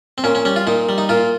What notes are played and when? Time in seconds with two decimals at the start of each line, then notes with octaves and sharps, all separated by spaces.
0.18 C4
0.24 A#2 C#4
0.35 C#4
0.45 G3 C#4
0.56 F4
0.67 A#2 D#4
0.89 G3
0.98 D#4
1.09 A#2 F4